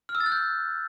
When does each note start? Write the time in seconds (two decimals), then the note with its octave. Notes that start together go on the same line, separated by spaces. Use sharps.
0.09 F6
0.15 E6
0.20 A6
0.26 F#6
0.32 G6